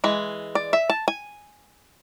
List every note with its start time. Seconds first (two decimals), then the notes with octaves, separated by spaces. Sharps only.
0.04 E3 G#3
0.55 D5
0.73 E5
0.90 A5
1.08 G#5